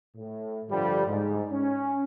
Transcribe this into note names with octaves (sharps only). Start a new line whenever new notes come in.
A2
G2 D3 F3 G3
G#2
C#4